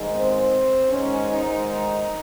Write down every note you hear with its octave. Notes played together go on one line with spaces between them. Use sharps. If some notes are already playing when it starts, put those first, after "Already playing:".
Already playing: G#2 D#3 G#3
C4
G#2 D#3 G#3 C#4
D#4